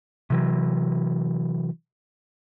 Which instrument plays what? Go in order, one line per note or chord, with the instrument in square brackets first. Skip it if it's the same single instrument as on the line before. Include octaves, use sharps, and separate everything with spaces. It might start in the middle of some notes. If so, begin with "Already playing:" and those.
[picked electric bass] C3 E3 F#3